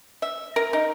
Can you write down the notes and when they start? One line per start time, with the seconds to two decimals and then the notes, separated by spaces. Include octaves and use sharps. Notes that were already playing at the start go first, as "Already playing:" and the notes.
0.22 E5
0.56 A#4
0.73 D#4